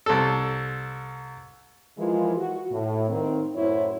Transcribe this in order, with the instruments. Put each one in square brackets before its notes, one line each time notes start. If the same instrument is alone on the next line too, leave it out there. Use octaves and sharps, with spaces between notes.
[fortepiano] C2 A4
[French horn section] E3 F3 G#3 E4 F4 A#4
F#4
A2
D#3 A#3 C4
F#2 A2 F#3 E4 C5 C#5